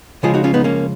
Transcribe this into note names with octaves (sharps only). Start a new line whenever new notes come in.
C#3 F3 G#3 F4 G#4
D#4 F#4
C#4 F4
B3 D#4
A#3 C#4